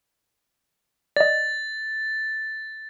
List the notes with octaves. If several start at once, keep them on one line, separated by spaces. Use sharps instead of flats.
D5 D#5 A6